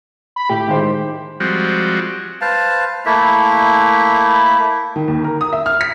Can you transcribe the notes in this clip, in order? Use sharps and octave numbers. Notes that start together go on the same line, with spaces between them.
B5
A2 G4
D#3 G#3 C5
F3 G3 G#3 C4 F#4
B4 C5 F5 A5
A3 A#3 E4 E5
D#3
D#2
A#4
D#6
E5
F6
B6